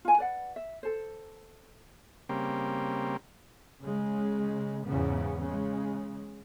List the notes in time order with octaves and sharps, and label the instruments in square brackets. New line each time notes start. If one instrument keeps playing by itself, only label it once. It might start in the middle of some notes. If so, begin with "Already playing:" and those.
[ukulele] F4 G#5
B4 D5 F#5
E5
A4 C5
[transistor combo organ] C#3 G3 A#3 C4
[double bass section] C#3 G#3
E2 G#2 C#3 B3
C#3 G#3